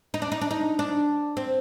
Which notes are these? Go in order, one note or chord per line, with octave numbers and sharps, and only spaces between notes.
D#4
D4
D#4
D4
D#4
D4
C4